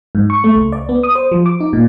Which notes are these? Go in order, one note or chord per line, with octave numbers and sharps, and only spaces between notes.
G#2
C#6
A3
C#2
D5
B3
D#6
C5
F3
D6
D#4
A#2